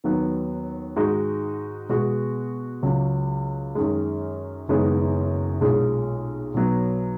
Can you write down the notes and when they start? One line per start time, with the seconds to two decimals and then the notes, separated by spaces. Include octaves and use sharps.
0.04 D#2 D#3 F#3 B3
0.96 G#2 D#3 G#3 D#4 F#4
1.89 B2 G#3 B3 F#4
2.83 C#2 C#3 F#3 C#4
3.75 F#2 D#3 G#3
4.68 F#1 F#2 D#3 G#3 B3
5.61 B1 A#2 G#3 C#4 G#4
6.54 B1 B2 F#3 B3